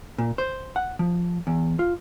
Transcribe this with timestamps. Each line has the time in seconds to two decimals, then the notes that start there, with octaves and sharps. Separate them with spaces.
0.18 A#2
0.38 C5
0.76 F#5
0.99 F3
1.47 E2
1.79 F4